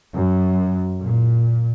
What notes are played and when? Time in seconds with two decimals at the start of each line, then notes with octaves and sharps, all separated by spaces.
0.12 F#2
1.03 A#2